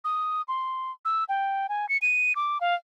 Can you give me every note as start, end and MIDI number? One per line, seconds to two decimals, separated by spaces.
0.04 0.42 87
0.48 0.91 84
1.05 1.24 88
1.29 1.67 79
1.69 1.89 80
1.89 1.97 97
2.02 2.35 99
2.36 2.61 86
2.61 2.75 77